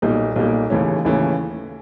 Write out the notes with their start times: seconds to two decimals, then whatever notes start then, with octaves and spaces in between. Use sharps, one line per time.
0.02 B1 A#2 G3 A#3 D#4
0.36 B1 A#2 G3 A#3 D#4
0.70 D#2 C#3 E3 A3 C#4
1.05 D#2 C#3 E3 A3 C#4